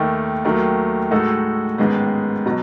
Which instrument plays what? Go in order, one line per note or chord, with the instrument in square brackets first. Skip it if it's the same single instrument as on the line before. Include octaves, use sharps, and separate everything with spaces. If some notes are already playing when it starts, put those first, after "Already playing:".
Already playing: [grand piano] D#2 D#3 A3
D#2 D#3 F#3 A3
A2 G#3 D#4 F#4 A4
A1 G#2 D#3 G#3 B3
B2 F#3